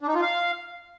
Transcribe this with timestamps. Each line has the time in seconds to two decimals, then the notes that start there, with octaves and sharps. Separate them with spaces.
0.01 D4
0.08 D#4
0.15 F4
0.22 F5